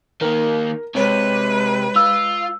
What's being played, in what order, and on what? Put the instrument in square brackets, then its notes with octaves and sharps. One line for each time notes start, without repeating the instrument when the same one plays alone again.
[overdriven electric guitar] D#3 A#3 [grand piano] A#4
[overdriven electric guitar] C3 [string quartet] G#3 B4 [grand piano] C#5
[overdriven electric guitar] F4 [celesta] E6